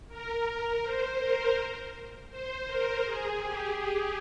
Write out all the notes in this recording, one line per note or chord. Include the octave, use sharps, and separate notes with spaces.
A#4
C5
A#4
C5
A#4
G#4
G4